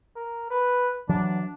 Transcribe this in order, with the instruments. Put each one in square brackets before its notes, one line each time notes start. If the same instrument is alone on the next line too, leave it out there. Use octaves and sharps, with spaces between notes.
[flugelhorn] A#4
B4
[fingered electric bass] E3 F#3 [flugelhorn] D4